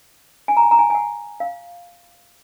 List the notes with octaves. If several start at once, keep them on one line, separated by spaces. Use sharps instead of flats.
G#5
A#5
G#5
A#5
G#5
G#5
F#5
F5